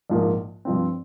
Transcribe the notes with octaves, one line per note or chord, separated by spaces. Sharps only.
A#1 G#2 F3 A#3
G2 F3 C4